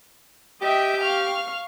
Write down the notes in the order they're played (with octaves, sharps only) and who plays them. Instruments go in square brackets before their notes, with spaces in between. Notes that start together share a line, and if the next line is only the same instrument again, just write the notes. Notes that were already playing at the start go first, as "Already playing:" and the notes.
[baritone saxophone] G4 [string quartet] D#5 E5 G5
[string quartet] F5 C#6 F6